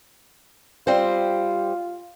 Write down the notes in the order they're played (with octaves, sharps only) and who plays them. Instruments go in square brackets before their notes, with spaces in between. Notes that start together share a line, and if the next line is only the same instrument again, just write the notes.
[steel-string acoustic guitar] G3 C4 C5 [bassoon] F4